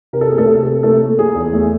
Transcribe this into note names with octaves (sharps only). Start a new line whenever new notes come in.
C3 A#4
A4
A#3 G#4
A3 A4
C3
C3
A3 A#3 A4
A#3
A#3 G#4
E2
A3